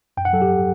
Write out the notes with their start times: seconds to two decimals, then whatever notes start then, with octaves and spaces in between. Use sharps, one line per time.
0.17 F#2 G5
0.25 F#5
0.33 F#3 A4
0.42 G4
0.50 F#3